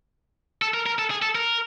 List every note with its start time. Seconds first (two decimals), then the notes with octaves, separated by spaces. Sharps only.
0.62 A4
0.74 A#4
0.86 A#4
0.99 A4
1.10 G#4
1.22 A4
1.35 A#4